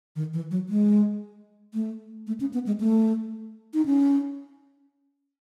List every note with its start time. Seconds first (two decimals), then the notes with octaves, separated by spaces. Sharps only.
0.16 D#3
0.34 E3
0.51 F#3
0.69 G#3
1.74 A3
2.27 A3
2.40 C#4
2.54 B3
2.67 G#3
2.80 A3
3.74 D#4
3.86 C#4